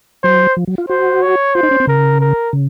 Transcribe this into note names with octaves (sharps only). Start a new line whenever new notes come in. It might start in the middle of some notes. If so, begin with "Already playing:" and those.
F#3 C5
F3
F#3
F4
F#4 C5
C#5
F4 C5
D#4
C#4
C4
C#3 A#4
A#4
C#3